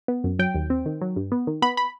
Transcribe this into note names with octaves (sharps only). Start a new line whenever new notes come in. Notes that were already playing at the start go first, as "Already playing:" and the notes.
B3
F#2
F#3 G5
D#2
C4
D#3
F#3
G2
B3
D#3
B3 B5
B5